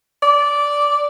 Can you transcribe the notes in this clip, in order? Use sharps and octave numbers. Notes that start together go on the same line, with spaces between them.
D5